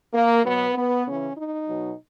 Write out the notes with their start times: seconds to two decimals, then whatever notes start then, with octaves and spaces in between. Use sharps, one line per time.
0.14 A#3
0.44 B2 F#3 B3
0.75 B3
1.05 C#3 E3 C#4
1.36 D#4
1.67 B2 F#3